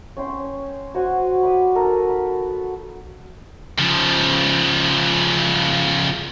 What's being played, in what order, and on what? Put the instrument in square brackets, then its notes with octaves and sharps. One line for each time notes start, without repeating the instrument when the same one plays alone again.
[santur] C#4 G5 C6
F#4 C5 F#5 G#5
B5 D6 D#6
D#4 A4 A#4
B5
[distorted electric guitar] C#3 F3